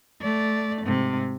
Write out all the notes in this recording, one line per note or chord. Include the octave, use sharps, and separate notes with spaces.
A3 D5
G#2 C3